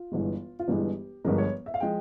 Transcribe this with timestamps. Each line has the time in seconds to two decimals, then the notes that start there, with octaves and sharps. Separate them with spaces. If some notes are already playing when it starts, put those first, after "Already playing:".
Already playing: F4
0.12 G1 G2 E3 G#3
0.59 F4
0.68 G1 G2 E3 G#3 G4
1.24 G1 G2 F3 G#3 A#4
1.38 C#5
1.66 E5
1.74 F5
1.80 F3 G#3 G5